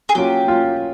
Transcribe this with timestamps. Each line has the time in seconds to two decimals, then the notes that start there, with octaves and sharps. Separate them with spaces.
0.09 G#4
0.15 F#3 A#3 C#4 F4 G4
0.48 F#3 A#3 C#4 F4